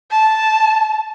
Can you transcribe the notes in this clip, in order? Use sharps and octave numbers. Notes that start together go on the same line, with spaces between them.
A5